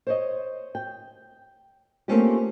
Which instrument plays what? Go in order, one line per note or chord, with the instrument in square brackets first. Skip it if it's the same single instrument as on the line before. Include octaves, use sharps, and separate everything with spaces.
[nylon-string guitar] C5 C#5 D#5
G5
A3 A#3 C4 C#4 F4 G4